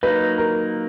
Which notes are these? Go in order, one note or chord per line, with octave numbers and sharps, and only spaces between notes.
F#3 A#3 D#4 B4
A#4